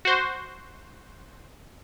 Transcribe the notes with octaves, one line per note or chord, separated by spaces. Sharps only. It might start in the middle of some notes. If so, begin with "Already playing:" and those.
F#4 C5